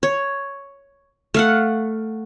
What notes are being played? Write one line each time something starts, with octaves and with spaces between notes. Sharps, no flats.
C#5
A3 F5 F#5